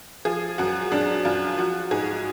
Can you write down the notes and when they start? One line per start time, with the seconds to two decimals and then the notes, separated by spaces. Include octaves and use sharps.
0.25 F3 G#4
0.58 F#2 F#4
0.92 F#2 D4
1.25 F#2 F4
1.58 F3 F#4
1.91 G#2 G#4